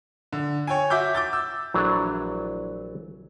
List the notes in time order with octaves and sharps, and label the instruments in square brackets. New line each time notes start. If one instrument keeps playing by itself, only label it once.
[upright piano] D3
C#5 G5 G#5
F#4 E5 D6 G6
D6 G6 A6
E6
[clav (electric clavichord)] A#1 E3 F#3 A3 D4